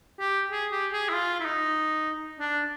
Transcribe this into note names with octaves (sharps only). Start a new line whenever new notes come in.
G4
G#4
G4
G#4
E4
F4
E4
D#4
D4